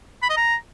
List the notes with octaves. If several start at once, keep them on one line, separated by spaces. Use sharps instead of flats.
B5
D#5
A#5